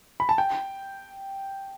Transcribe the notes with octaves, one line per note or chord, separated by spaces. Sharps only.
B5
A5
G5